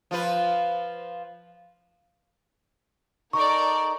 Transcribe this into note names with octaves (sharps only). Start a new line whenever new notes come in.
F3 F4 B4
D#4 A4 A#4 D5 C#6